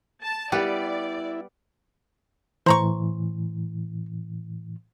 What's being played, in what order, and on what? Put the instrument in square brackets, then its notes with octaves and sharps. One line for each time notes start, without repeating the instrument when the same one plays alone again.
[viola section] A5
[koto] G3 B3 [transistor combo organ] E4 [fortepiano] G4 G5 [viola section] D5
[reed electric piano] A2 E3 [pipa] C5 A#5 C#6